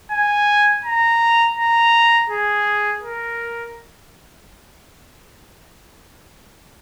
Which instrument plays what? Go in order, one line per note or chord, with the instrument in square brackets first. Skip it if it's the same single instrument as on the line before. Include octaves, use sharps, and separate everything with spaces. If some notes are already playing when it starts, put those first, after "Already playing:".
[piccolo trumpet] G#5
A#5
A#5
G#4
A#4